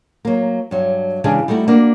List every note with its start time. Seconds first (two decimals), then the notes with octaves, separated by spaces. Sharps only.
0.25 F#3 A#3
0.71 G2 F#3
1.24 C#3 E3 G#3 D4 G4 G#4
1.48 G3 A3 D#4 E4 F#4
1.68 A#3 B3 D4 F#4